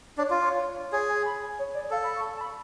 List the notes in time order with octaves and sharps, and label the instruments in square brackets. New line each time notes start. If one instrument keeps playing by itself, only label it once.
[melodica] D4 [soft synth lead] C#5
[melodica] F4
[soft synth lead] C#5
[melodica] G#4 [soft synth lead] C#5
[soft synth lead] G#5
B5
G#5
C#5
D5
[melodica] A4 [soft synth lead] F5
[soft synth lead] B5
C#6
A5
B5